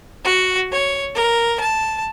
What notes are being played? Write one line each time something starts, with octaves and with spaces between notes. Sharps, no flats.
F#4
C#5
A#4
A5